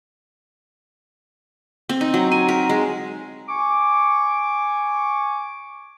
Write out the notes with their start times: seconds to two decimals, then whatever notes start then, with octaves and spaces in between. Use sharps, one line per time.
1.89 C4
2.01 D#4
2.14 F#3
2.32 G#5
2.49 A#4
2.69 G#3
3.49 G#5 C#6 D6